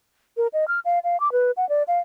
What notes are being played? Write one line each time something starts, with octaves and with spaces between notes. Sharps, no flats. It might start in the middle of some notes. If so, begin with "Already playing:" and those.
A#4
D#5
F6
F5
F5
D6
B4
F#5
D5
F5